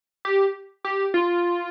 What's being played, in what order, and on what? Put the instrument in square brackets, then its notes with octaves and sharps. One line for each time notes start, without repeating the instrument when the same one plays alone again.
[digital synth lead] G4
G4
F4